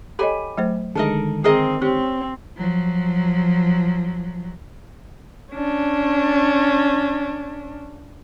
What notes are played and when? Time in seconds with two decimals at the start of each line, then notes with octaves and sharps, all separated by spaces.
0.19 G4 A4 C#5 D#5 G#5 B5
0.58 F#3 A3 C5
0.95 D3 D#3 G#3 A4 A#4 D#5
1.44 C4 G#4 A#4 D#5
1.82 C4 C#4 G4
2.57 F3 F#3
5.53 C#4 D4